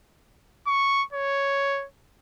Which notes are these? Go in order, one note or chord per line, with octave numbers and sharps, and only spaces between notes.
C#6
C#5